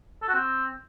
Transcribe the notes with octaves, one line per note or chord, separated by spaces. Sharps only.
A4
F#4
C4